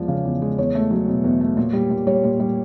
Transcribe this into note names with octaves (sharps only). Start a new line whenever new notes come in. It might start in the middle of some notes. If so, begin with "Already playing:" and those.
Already playing: E2 F3 G#3 D5
C#3
E2
G#3
E2 C#5
A3
F#3
B2
E2
A3
A#2
G3
A#2
G3 C#5
A#2
G3